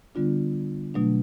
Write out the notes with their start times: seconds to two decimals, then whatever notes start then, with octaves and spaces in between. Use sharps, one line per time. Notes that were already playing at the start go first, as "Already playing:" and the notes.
0.15 D3 G3 B3 D4 F4
0.94 B2 F#3 A3 D4